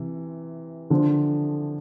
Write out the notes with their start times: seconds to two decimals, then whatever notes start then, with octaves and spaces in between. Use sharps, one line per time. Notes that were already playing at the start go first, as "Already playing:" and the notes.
Already playing: C3 E3
0.90 D3 F3